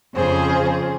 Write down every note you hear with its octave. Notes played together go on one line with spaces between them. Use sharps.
F2 C#3 F3 G#4 C5